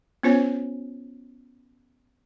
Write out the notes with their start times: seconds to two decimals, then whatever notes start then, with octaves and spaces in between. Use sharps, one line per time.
0.23 B3 C#4 F4 C5 C#5 G#5